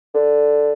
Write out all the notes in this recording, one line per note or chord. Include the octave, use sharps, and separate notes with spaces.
D3